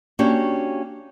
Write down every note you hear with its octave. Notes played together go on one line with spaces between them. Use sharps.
A#3 C#4 D4 F#4 G4